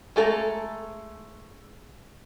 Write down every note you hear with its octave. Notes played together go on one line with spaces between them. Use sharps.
G#3 A3 A4 A#5